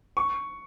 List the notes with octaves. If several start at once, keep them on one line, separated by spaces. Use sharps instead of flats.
C#6